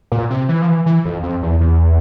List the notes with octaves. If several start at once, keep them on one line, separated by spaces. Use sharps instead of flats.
A#2
C3
E3
F3
E3
E3
F2
F2
E2
E2